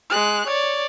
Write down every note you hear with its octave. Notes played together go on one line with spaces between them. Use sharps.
G#3 F#6
C#5 D5